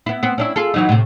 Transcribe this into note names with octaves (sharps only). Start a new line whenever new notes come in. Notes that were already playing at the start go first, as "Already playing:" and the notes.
B3 E4
B3 C4
C#4 D4 E4
F4 G#4 A4
E3 F#3 D#4
A2 C3